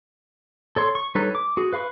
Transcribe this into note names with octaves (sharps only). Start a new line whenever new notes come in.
A4 C#5 C6
C#6
G3 D#4 A4 B4 C#5
D6
F#4 G#4
B4 F5 B5 C#6